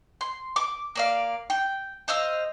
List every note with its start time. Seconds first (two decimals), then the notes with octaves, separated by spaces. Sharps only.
0.21 C6
0.56 D6
0.95 A#3 D5 F5
1.50 G5
2.08 C5 D#5 F5 E6